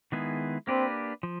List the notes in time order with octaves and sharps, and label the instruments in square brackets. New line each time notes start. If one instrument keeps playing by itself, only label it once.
[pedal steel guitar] D#3 G#3 B3 E4 G#4
[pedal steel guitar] A#3 D4 G4 B4 [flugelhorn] C4
[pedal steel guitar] F3